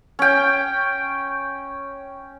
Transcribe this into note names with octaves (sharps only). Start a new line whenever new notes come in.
C#4 G5